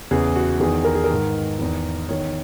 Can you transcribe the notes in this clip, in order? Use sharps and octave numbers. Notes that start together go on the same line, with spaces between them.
E2 C#3 E3 G#4
F#4
E2 D#3 G#4
A#4
G#4
A#4
G#2 D#3
E2 D#3
E2 D#3 C#5